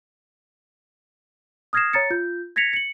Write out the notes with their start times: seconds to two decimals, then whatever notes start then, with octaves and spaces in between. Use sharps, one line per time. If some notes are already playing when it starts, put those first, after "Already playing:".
1.73 D#6 F6 G#6 A#6 C7 E7
1.93 C#5 A#5 A6 C#7
2.10 F4 G6
2.56 G#6 A#6 B6 C#7 F7
2.73 C#7 F#7